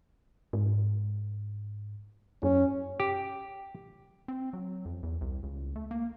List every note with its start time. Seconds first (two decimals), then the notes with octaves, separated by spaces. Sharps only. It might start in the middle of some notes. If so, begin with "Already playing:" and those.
0.53 G#2
2.43 F#2 C#4
3.00 G4
4.28 C4
4.53 F#3
4.85 F2
5.03 E2
5.21 C2
5.43 C#2
5.76 A3
5.91 A#3